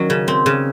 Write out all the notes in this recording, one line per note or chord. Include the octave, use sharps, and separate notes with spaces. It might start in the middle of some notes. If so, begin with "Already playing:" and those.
Already playing: D#3 F#3 C#4
C#3
C4
C#3